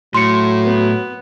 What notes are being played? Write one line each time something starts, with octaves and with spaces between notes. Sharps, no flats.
A2 F#3 C6 C#7
B3